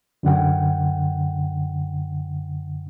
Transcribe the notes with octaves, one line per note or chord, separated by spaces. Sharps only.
F#2 D3 F#5 G5